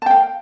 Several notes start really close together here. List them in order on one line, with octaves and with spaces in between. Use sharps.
A5 G5 F5